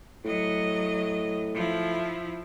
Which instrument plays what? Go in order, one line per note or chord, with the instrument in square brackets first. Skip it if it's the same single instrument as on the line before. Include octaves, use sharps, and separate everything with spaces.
[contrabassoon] A2 [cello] F#3 D#5
[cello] F3 E4